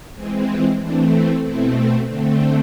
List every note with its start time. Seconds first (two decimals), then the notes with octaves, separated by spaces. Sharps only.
0.15 E3 G#3 C4 G#4
0.47 F4
0.79 E3 A3 C4 D4
1.43 B2 A3 C4 E4
2.07 D3 A3 C4 D4